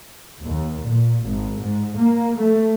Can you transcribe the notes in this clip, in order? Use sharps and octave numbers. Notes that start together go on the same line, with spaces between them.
D#2
A#2
G#1
G#2
A#3
A3